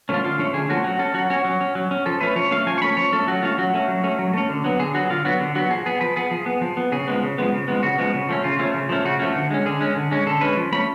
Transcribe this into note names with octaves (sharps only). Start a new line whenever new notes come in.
F3 A3 C#4 F4
D3 F4
F3 A3 C#4
D3 G#4
F3 A3 C#4 F#4
F#3 F#4
C#4 A4
F#3 F#4
C#4 F#4
F#3
C#4
F#3
C#4
F3 A4
A3 C#4 B4
F3 C#5
A3 C#4 F5
F3 G#5
C#6
A3 C#4 B5
F3 C#5
A3 C#4 A4
F#3 F#4
A3 C#4 F4
F#3 F#4
A3 C#4
F#3
A3 C#4
F#3
A3 C#4
D3
F#3 B3
D3 G#4
F#3 B3 F#4
D3 F4
F#3 B3 F#4
D3
F#3 B3 F#4
F3 G#4
B3 G#4
F3 B4
B3 G#4
F3
B3
F3
B3
C#3 G#4
F3 G#3 B3
C#3
F3 G#3 B3
C#3
F3 G#3 B3
C#3 F#4
F3 G#3 B3
C#3
F3 A3 C#4
C#3 F4
F3 A3 C#4
C#3
F3 A3 C#4
C#3 F#4
F3 A3 C#4
D3
G#3 C#4
D3 G#4
G#3 C#4
D3
G#3 C#4
D3 A4
G#3 C#4 B4
F3
A3 C#4 B5